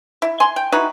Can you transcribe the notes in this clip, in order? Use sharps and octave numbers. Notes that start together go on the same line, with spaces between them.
E4
G#5 C6
G5
D#4 E4 F#4 B4